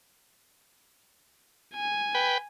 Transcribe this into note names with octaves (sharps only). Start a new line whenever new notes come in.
G#5
B4 G5